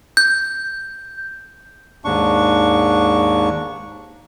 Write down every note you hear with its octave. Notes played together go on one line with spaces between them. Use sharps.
G6
D#2 G#2 D4 C#6